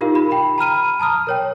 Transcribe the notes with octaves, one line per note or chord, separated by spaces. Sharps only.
D#4 F4 G4 A#4 F5
B5
G5 B5
A#5 B5 F6 D#7
A5 A#5 D#6 F6
A#4 C#5 G5